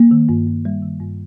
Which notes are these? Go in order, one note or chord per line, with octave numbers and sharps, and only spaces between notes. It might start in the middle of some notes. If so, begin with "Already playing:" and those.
Already playing: G3 A#3
D#3
G2
G2
G3
D#3
G2